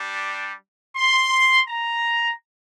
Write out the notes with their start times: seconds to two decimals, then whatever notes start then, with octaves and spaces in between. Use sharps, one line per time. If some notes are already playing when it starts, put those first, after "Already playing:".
Already playing: G3 D4 G4
0.96 C6
1.68 A#5